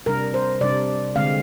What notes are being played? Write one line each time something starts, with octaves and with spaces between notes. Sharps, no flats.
C3 G3 D4 A#4
C5
C3 G3 D4 D5
D3 G#3 C4 F5